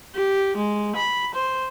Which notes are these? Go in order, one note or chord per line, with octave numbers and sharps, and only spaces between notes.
G4
G#3
B5
C5